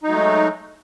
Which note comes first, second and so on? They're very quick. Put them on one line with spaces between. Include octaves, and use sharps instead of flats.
D#4 F#3 A3 G#3